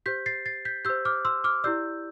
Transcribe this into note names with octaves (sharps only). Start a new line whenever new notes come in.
G4 C5 G6 B6
A6 C7
A6 C7
G6 B6
G4 C5 E6 G6
D6 F6
C6 E6
D6 F6
E4 G4 D5 E6 G6